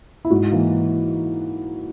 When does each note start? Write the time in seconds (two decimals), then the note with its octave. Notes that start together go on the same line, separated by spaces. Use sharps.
0.25 E4
0.31 G#2 F#4
0.52 E3 A#3